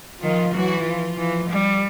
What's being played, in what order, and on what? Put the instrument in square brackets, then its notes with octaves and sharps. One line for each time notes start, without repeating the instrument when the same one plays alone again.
[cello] D#3 [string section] F3 F4
[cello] E3 [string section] F#3 F#4
[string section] F3 F4
[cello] E3
G3